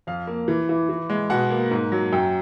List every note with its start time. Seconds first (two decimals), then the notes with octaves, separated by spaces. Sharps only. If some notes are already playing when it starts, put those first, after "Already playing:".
0.07 F2 F5
0.27 A#3
0.48 E3
0.69 E3
0.89 E3
1.10 G#3
1.30 B2 F#5
1.50 A#3
1.71 G#2
1.92 F#3
2.13 F#2 G5